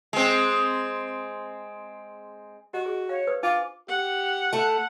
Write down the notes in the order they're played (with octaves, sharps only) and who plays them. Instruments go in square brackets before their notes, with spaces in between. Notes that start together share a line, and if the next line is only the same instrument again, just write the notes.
[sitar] G#3 C4
[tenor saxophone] F#4 [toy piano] G4 D#5
[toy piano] G#4
[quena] C#5 [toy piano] F5
[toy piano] B4 C5 D#6
[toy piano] D4 G#5 [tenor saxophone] F4 [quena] D6
[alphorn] G4 [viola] F#5
[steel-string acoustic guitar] A3 A4